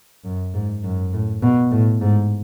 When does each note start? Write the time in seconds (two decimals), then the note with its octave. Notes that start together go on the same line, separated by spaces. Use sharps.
0.24 F#2
0.54 G#2
0.84 F#2
1.13 A2
1.42 B2
1.72 A2
2.01 G#2